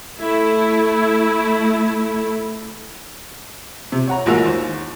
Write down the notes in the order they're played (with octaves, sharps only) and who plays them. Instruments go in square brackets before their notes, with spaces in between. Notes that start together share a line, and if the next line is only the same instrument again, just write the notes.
[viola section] A3 E4
[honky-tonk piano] C3
C#5 F#5 A#5
A1 G#3 A#3 F#4 E6 F7
D#2 C5